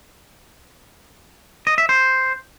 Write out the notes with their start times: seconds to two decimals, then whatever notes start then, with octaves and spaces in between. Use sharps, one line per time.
1.67 D#5
1.78 E5
1.89 C5